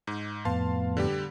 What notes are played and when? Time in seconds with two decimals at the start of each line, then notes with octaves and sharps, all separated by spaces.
0.07 G#2
0.45 F2 A2 B3 F5 A5 C6
0.97 D3 G3 G4